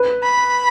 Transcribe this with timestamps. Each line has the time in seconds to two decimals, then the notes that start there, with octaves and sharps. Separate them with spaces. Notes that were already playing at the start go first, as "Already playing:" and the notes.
Already playing: B4
0.24 B5